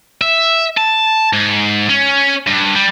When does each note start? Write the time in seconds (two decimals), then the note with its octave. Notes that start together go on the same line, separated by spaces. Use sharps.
0.21 E5
0.77 A5
1.33 G#2
1.90 C#4
2.47 G2
2.75 G3